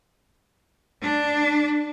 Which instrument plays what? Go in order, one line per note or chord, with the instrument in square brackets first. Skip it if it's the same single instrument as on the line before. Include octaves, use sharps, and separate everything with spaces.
[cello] D4